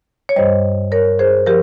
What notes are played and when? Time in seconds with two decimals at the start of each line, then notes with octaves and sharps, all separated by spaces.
0.29 C#5
0.36 G2 G3 C5 D#5
0.92 A#4 C#5
1.19 G#4 C5
1.47 F3 G4 A#4